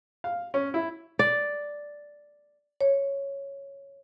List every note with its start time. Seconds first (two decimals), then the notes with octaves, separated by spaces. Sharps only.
0.24 F5
0.54 C#4
0.74 E4
1.19 D5
2.81 C#5